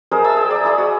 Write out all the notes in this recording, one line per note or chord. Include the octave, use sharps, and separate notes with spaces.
G#4 A#4 C5 D#5
E5 A5 E6
G#4 G5
D5 A#5
E4 G#4 D#5
F#4